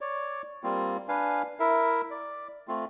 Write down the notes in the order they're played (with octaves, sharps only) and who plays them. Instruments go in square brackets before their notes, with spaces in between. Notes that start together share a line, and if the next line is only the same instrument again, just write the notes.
[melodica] C#5 D5
G3 A#3 C4 F4
D4 B4 F5 G#5
E4 A#4 E5
D5
A3 C4 F4